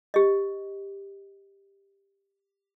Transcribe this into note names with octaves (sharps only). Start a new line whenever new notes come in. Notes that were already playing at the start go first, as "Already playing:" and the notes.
G4 D#5